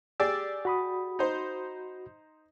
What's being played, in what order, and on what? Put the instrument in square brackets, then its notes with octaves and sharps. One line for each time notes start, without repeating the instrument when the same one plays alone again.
[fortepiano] G4 G#4 D5 [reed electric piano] E6
[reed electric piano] F#4 B5 D#6
[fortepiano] D#4 C5